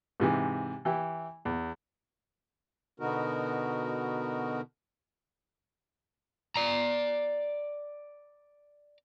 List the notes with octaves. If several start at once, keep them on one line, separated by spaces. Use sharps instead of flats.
G#2 C3 E3
E3 E4 G4
E2
B2 D3 B3 D#4 F#4 A#4
D5 A#5